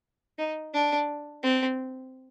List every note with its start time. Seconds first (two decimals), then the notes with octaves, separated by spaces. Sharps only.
0.38 D#4
0.74 D4
1.43 C4